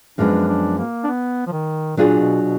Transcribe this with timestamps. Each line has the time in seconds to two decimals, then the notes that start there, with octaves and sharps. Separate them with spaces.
0.18 F#2 F3 G#3 B3 D4
0.48 D4
0.78 A#3
1.04 D4
1.08 B3
1.47 F3
1.52 D#3
1.97 A#2 F#3 D4 F4 G#4
2.19 B2
2.42 B2